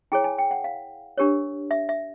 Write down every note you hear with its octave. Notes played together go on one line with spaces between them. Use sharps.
E4 G#4 C#5 G5
G#5
G5
F#5
F5
D4 G4 A#4 C#5
E5
E5